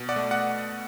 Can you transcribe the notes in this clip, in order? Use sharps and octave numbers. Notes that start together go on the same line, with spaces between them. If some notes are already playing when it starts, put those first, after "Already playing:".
Already playing: B2
D5 F#5
A3
D5 F#5